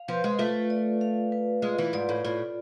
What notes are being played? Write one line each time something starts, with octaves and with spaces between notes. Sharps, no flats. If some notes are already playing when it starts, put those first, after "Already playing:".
Already playing: F5
F3 B4
G#3
A3 F4
D5
F5
B4
G#3 F4
E3
G#2 D5
A2
A2 F4